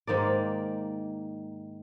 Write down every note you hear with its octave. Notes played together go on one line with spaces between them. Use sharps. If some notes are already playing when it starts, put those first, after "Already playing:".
G#2 D#3 A#3 D5